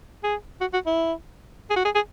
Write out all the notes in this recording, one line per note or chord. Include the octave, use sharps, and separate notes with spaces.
G#4
F#4
F#4
E4
G#4
F#4
G#4
G#4